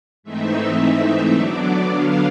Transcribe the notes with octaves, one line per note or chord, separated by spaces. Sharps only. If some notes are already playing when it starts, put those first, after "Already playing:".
G#2 E3 A3 C4 D#4 E5
D3 F#3 B3 D4 D5
F5